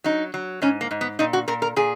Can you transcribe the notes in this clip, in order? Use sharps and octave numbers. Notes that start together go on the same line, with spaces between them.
F#3 D#4
F#3
G#2 C#4
A#3
G#2
B3
A#2 D#4
F#4
A#2 A#4
A#4
A#2 G#4